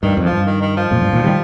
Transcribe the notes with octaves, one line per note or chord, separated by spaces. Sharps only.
G2 D#3
F2
F3
G2
D#3
D#3
F3
F2 A#2
G2
A#2 D#3
D#3 G3